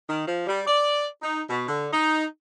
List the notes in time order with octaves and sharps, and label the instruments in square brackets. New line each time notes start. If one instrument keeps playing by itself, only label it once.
[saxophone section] D#3
F3
G3
D5
D#4
B2
D3
D#4